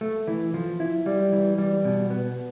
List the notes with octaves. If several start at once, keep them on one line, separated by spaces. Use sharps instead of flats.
A3
E3
F3
E4
G3
E3
G3
B2
B3